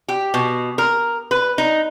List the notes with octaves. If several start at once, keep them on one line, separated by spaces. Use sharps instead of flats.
G4
B2
A#4
B4
D#4